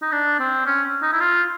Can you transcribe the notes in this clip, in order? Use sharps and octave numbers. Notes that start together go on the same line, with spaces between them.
D#4
D4
C4
C#4
D#4
E4
F4